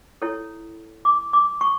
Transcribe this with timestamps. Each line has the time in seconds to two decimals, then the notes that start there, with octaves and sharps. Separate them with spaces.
0.22 E4 A4 C#5
1.05 D6
1.33 D6
1.61 C#6